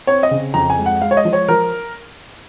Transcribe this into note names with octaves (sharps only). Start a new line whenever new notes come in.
C4 C#5
D#5
C#3
F2 A#5
G#5
G#3
F#5
G#3 F5
C#5
D#5
F3
C#5
F3 A#4